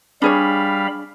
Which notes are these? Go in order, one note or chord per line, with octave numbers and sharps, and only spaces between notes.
G3 D4 G#4 C#5 F5 B5